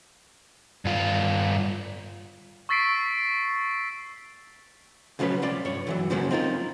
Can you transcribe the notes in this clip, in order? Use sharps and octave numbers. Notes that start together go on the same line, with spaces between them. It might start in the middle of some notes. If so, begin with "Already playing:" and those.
G2 F4
C#6 E6 A6 B6 C7 D7
C#3 F3 F#3 C#4 B4
C2 F4 D5
G2 C#5
G2 E3 F#3
F#2 C#3 F3 F#3 A#3 C#4
C4 D#4 F4 A#4